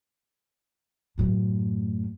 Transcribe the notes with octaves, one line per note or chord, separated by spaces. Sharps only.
F#2 A2